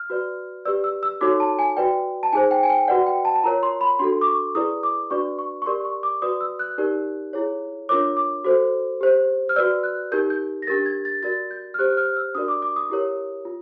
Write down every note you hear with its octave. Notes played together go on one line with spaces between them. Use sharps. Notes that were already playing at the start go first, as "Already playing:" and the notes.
Already playing: F6
F#4 B4 D5
G4 B4 D5 E6
E6
E6
D#4 F#4 A4 C#5 D6
A5
G#5
F#4 B4 D5 G5
A5
D#4 G#4 C5 G#5
G5
G#5
G5
F#4 B4 D5 F#5
G5
A5
A5
F4 A#4 C#5 A#5
C6
B5
D4 F#4 A4 C6
D6
C#6
E4 G#4 B4 D5 D#6
D6
D4 F#4 B4 D5 C#6
C#6
C#6
G4 A#4 D5 C6
C#6
D6
F#4 B4 D5 D#6
E6
F#6
D#4 G4 A#4 D5
E4 G#4 C#5
D4 F4 A#4 C#5 D6
D6
F#4 A4 C5
G4 C5
F6
F#4 B4 D5 E6
F#6
D#4 G4 A#4 G6
G6
A#6
D4 G4 A#4 A6
G#6
A6
F#4 A#4 D5 A6
G6
F6
G4 C5 F#6
F6
E6
D4 F#4 A#4 D5 D#6
D6
D6
D#6
E4 G4 A#4 C#5
F4